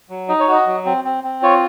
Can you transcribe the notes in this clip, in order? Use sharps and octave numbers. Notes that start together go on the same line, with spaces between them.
F#3
D#4 D#5
C#5
F#4 D#5
F#3
C4
C4
C4
F4 C#5